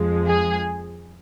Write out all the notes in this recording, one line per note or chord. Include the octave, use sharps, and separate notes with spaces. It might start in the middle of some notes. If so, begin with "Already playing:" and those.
Already playing: F2 F3 G#3
G#4